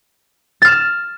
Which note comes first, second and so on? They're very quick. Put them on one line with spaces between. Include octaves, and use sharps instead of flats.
A6 F6 E7